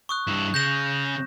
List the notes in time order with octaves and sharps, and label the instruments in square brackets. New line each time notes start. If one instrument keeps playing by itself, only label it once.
[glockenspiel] C#6 D#6 F#6
[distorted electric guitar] G2 E4
[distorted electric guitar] C#3 [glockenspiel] G6 A#6 E7